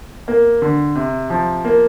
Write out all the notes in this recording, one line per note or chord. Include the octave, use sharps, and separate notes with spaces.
A#3
D3
C3
F3
A#3